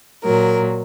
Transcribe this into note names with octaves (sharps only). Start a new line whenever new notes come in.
A#2 F#3 A#4